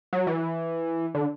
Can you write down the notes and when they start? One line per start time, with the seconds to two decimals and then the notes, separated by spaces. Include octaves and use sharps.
0.13 F#3
0.27 E3
1.15 D3